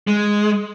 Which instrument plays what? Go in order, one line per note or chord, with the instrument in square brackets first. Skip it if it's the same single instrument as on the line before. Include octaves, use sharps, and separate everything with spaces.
[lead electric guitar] G#3